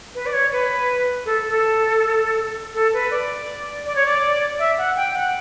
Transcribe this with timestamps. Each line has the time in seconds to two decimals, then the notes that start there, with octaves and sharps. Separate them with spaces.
0.15 B4
0.26 D5
0.33 C#5
0.52 B4
1.26 A4
1.49 A4
2.74 A4
2.93 B4
3.11 D5
3.86 D5
3.96 C#5
4.07 D5
4.59 E5
4.78 F#5
4.96 G5
5.14 F#5